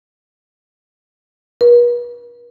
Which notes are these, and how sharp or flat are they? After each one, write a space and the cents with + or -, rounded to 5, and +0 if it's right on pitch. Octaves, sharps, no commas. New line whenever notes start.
B4 -45